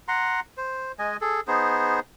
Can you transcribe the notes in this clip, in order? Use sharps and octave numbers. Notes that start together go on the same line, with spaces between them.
F#5 A#5 C6
C5
G#3 D#5 G#5
G#4 A4
B3 D#4 G#4 C5